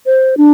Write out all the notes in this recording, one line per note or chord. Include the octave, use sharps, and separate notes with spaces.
C5
D4